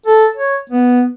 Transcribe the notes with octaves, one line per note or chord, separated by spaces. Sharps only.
A4
C#5
B3